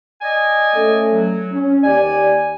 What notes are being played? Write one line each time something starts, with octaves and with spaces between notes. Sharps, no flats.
D5 D#5 G#5
A3 C#4 A4
F#3
C#4
D#2 G4 D5 G#5